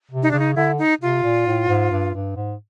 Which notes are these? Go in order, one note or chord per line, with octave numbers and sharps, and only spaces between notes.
C3
D#4
C#3 D4
D#4
D3 E4
D#4
C3 F4
A#2
A2
G#2
G2
G2
G#2